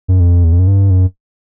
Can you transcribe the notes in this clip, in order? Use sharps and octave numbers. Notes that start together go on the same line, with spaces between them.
F#2
F2
E2
F2
F#2
G2
F#2